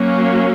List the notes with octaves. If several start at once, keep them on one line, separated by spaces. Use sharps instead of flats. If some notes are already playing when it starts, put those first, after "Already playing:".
Already playing: F#3 A#3 C#4